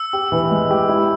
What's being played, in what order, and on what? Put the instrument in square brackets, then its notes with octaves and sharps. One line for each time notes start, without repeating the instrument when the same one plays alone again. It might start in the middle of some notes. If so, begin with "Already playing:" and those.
Already playing: [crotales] E6
[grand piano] G4
E3
G#3
G4
E4